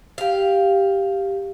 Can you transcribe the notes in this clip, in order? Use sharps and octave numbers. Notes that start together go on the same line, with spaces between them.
G4 F5